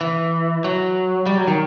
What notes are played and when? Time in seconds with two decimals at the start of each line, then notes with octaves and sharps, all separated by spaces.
0.01 E3
0.64 F#3
1.26 G3
1.38 F#3
1.47 D#3